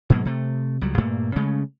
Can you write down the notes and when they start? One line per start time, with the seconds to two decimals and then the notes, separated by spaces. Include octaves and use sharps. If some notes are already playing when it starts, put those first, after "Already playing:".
0.10 G#2 B2 F#3 A#3
0.25 C3 A3
0.81 C#2 F#3 G3
0.98 G2 A#2 A3 A#3
1.36 C#3 G#3 A3 C#4